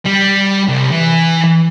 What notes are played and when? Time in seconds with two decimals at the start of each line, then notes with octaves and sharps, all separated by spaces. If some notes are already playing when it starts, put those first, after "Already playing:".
0.05 G3
0.68 C2
0.91 E3